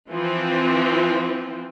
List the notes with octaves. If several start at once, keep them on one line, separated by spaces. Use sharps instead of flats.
E3 F3 C4